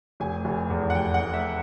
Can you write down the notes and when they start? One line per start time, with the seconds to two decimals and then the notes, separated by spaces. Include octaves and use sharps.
0.20 F1 G#5
0.45 F1
0.70 E2
0.90 F#5
0.95 F1 G5
1.14 F#5
1.20 F1
1.34 E5